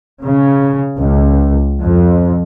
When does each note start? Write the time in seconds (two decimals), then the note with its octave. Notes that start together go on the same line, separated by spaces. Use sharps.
0.22 C#3
0.97 C#2
1.84 F2